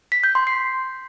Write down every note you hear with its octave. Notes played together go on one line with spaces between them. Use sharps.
B6
G6
C6
C7